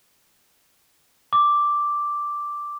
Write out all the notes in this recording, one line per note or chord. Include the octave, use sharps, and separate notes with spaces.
D6